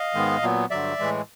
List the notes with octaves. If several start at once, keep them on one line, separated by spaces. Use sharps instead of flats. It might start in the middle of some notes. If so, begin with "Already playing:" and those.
Already playing: D#5 F5
G#2 D#3 G#3 B3
A#2 F#3 B3
G2 D3 F#3 D5 E5
A2 E3 G#3